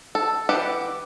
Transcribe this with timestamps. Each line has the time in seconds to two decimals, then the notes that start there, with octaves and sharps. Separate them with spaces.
0.15 A4
0.49 E3 G4 F#5